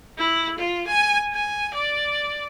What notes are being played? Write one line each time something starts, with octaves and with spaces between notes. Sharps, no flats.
E4
F4
G#5
G#5
D5